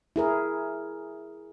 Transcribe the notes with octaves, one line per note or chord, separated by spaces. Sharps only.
E4 G#4 A#4